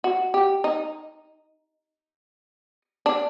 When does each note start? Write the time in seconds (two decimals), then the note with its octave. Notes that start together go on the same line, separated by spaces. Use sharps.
0.04 F#4
0.34 G4
0.64 D#4
3.06 D4